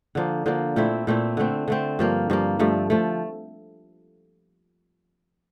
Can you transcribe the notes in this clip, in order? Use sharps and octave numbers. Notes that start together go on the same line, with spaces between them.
D3 F3 A#3
D3 F3 A#3
A#2 A3 C4 E4
A#2 A3 C4 E4
D3 A3 C4
D3 A3 C4
G2 F3 A#3
G2 F3 A#3
G2 F3 A3
F3 A3